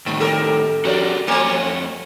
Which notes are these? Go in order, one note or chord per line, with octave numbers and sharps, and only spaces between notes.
A2 D#3 A#3
G4 A4 A#4
F2 F#4 G4 A#4 C5 D5
F2 A3 C4 C#5 G#5